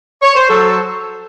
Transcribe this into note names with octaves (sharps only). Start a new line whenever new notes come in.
C#5
C5
F#3 A4